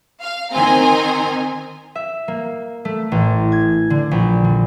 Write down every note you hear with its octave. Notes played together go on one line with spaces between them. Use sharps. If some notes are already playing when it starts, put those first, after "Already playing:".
F5
D#3 C4 G#5 A#5 C6
E5
A#3
A3
A1
G#6
D3
A#1
D3